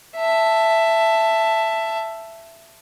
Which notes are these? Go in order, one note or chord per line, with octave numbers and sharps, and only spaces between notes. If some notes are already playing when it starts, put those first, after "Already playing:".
E5 A5